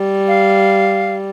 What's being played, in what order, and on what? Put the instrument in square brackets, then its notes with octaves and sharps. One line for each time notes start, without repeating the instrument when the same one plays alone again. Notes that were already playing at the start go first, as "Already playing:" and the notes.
Already playing: [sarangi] G3
[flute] F5